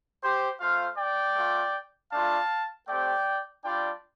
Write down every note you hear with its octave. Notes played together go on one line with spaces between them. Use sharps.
G4 C5
A3 F4 C5 F5
D5 G5
A3 F4
A3 D4 F4 F5 A5
A3 C4 G4 D5 G5
G3 D4 F4 D5 G5